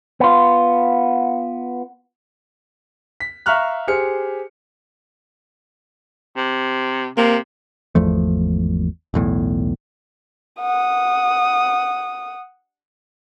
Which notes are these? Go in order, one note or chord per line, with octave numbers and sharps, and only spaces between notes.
B3 F4
B6
E5 F5 A#5 C#6 F6 F#6
G4 G#4 C5 F6 C#7
C3
C3 A#3
G#1 E2 F3 A3
B1 E2 A2
F#5 D#6